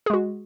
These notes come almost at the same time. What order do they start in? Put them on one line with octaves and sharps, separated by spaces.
G#4 G#3 F#4